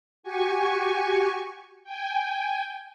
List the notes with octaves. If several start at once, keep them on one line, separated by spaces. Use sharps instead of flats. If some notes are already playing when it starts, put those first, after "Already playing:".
F#4 G4 G#5 C#6
G5 G#5